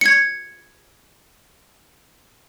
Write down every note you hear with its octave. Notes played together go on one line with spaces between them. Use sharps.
G#6 C#7